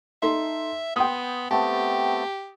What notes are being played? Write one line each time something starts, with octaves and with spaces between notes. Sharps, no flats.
D#4 A4 E5 C6
B3 G5 C6 D#6
A3 B3 C4 G4 A5